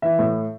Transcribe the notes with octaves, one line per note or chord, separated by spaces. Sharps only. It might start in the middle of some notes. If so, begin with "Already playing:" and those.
E3 E5
A2